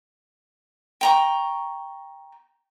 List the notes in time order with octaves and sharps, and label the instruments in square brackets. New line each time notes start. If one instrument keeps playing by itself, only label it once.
[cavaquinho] G5 A#5 C#6